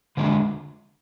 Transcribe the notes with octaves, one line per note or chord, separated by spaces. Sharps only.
D3 G#3 D4